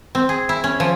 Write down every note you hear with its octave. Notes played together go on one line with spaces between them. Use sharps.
C4
G#4
E4
C#4
F3